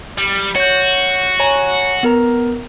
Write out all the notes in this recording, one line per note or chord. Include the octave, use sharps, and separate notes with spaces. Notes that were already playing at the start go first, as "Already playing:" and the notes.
G3
F#4 C#5 G6
C#5 G#5 A#5
B3 A#4 A#5